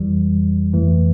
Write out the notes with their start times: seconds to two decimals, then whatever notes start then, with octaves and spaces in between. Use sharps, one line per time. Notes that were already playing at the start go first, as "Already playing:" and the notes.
Already playing: G1 F2 E3 G3
0.74 G1 F2 E3 A3